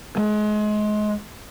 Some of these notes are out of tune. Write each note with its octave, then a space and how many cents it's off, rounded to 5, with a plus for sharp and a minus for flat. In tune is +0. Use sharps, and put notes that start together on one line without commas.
G#3 +30